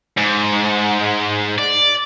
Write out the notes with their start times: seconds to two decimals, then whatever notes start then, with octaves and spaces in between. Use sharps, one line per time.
0.18 G#2
1.58 D5